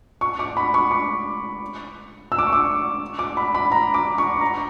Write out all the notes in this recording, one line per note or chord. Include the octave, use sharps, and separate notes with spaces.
C#6
D6
B5
C#6
D6
E6
D6
C#6
D6
D6
B5
B5
A#5
D6
C#6
A#5